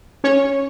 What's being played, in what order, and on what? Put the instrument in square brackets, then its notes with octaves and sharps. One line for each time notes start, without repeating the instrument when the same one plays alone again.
[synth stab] C#4 C#5